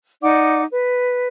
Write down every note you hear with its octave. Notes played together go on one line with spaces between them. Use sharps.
D#4 D5 F#5 D6
B4